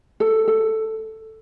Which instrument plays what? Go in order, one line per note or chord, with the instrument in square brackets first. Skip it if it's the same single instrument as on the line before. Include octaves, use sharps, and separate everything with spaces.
[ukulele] A4
A4